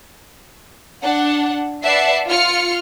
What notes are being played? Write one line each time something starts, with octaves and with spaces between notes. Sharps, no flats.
D4 F#5
B4 D5 E5 F#5 A5 C7
F4 F6 C#7